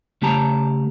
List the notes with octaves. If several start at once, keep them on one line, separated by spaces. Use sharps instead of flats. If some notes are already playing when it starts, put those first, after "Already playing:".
C#3 A3 G4 A5 A#5